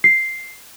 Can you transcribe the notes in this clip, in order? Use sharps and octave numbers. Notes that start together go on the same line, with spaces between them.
C7